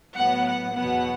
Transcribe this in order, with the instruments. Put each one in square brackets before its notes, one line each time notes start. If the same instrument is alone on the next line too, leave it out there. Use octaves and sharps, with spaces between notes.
[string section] A2 F#3 B3 F#5
F#5
E2 B2 F#3 B3 F#5